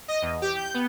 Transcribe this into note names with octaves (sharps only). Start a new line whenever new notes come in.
D#5
E2
G4
G6
B3